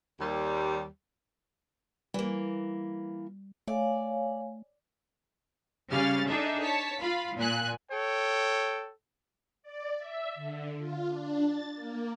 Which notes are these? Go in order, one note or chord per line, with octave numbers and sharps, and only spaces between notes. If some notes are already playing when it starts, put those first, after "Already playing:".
D#2 G3
E3 G3 A#3
A3 C#5 D5 F5 G#5
C#3 G3 C#4 F5 F6 A6
D4 D#4 G#4 A4 E5
C#5 A5 B6
F4 F5 B5
A#2 G#5 F#6
A4 C#5 G5
D5
E5
D3
F4
D4
A6
A#3